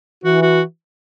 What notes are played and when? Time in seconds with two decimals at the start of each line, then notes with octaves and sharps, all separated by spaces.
0.24 E3 F#4
0.42 F#4